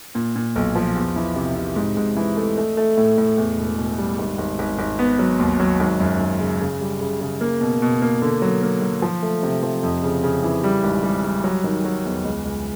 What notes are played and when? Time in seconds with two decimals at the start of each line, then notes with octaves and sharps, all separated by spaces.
0.15 A#2
0.36 A#2
0.56 B1
0.75 F3
0.96 E2
1.16 E3
1.36 C3
1.57 C3
1.76 G#2
1.97 G#2
2.17 E3
2.37 A3
2.57 A3
2.77 A3
2.97 A2
3.18 A2
3.38 E2
3.58 E1
3.78 B2
3.98 G3
4.18 G#1
4.38 G#1
4.59 G#1
4.79 G#1
4.99 B3
5.19 F#3
5.39 D#2
5.60 F#3
5.80 G#1
6.00 F#2
6.20 G#1
6.40 C#3
6.61 C#3
6.81 G3
7.01 C#3
7.21 C#3
7.41 A#3
7.61 B2
7.82 B2
8.02 A#3
8.22 D3
8.42 F#3
8.63 A#3
8.82 F#3
9.02 F3
9.23 A3
9.43 C3
9.63 F3
9.83 F2
10.03 C#3
10.23 C#3
10.43 E3
10.64 G3
10.84 G#1
11.04 G3
11.24 G3
11.44 F#3
11.64 D#3
11.85 F#3
12.05 E2
12.25 C#2
12.45 C#2